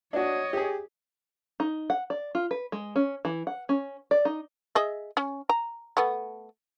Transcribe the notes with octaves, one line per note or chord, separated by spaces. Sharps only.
D4 F#4 C#5 D#5
G4 G#4
D#4
F#5
D5
F4
B4
G#3
C#4
E3
F#5
C#4
D5
D#4
G#4 D#5 E5
C#4
A#5
A3 B3